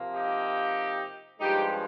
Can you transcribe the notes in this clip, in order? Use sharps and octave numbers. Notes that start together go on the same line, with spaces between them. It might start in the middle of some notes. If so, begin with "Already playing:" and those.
Already playing: C3 F3 A#3
D#4 G4
G2 F3 G#3 D#4 G4